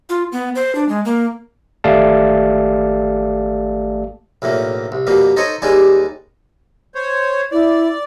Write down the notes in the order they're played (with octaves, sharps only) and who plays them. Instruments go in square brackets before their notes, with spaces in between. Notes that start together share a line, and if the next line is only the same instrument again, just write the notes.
[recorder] F4
B3
C5
D4
G#3
A#3
[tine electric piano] G#1 A3 G4 D5 F5 A5
[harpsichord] B1 E2 A2 A#3
C2
F2 B2 G3 A#3
D#4 A4 C5 C#5 D#5
D#2 G3 G#3 D#4 G#4 D5
[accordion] C5 C#5
[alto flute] E4 [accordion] D5